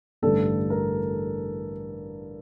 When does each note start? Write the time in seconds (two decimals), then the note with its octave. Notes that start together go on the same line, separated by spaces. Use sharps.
0.22 A1 G2 D3 A4
0.70 A#4